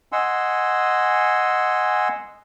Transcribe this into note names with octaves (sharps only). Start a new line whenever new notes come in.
D#5 F#5 G#5 C6 E6